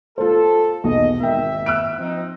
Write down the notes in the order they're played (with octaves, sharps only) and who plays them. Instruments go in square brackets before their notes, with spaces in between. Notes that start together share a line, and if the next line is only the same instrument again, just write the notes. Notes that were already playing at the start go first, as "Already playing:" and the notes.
[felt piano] F4 C5 [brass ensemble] A4
[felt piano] B1 E2 [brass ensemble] D#5
[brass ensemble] G#1 E5 [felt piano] A#4 G5
[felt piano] E6 F#6 D7
[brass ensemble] F3 C4 D#4